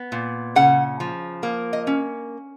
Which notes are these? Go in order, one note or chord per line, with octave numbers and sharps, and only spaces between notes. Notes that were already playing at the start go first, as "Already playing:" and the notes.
Already playing: B3
A#2
C#3 F#5
F3
A#3
D#5
C#4